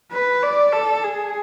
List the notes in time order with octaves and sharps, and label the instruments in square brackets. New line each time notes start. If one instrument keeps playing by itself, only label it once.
[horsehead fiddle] B4
D5
A4
G#4